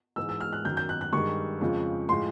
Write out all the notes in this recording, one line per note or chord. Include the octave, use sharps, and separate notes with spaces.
G#2 E3 G#3 E6
E6
F6
F#6
F#2 D#3 F#3 G6
G6
F#6
F#6
G2 D#3 G#3 C#6
F2 C#3 F3 G#3
A2 F3 G#3 C6